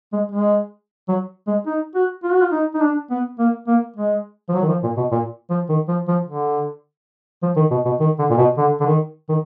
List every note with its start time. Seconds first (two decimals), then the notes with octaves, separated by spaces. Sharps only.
0.13 G#3
0.32 G#3
1.09 F#3
1.47 G#3
1.67 D#4
1.95 F#4
2.24 F4
2.33 F#4
2.42 F4
2.52 D#4
2.75 D#4
2.82 D4
3.10 B3
3.39 A#3
3.68 A#3
3.97 G#3
4.49 F3
4.54 F#3
4.63 D#3
4.69 F3
4.83 A#2
4.97 B2
5.12 A#2
5.50 F3
5.69 D#3
5.88 F3
6.08 F3
6.27 D3
7.43 F3
7.56 D#3
7.71 B2
7.85 B2
8.00 D#3
8.19 D3
8.30 A#2
8.38 B2
8.58 D3
8.80 D3
8.86 D#3
9.29 D#3